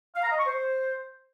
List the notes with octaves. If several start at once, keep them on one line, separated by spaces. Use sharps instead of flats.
F5
A#5
D#5
C#6
C5